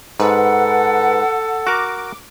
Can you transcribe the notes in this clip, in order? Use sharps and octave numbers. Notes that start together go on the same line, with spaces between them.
G#2 A4 B4 F#5
F#4 A#4 D6